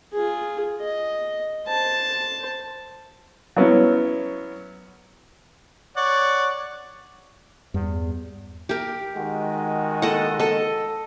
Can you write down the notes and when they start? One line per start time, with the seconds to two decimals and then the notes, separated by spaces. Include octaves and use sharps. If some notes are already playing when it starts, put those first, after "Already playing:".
0.13 F4 G#4
0.81 D#5
1.68 C5 A5
3.56 F#3 B3 C#4 E4
5.97 C#5 D5 F#5
7.74 E2 G2
8.69 G4 A#4
9.15 D#3 G#3 F#4
10.02 A4 D#5 F#5
10.40 A4 D#5